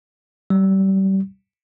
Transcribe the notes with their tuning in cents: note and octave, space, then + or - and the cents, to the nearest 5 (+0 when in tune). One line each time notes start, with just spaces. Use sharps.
G3 -30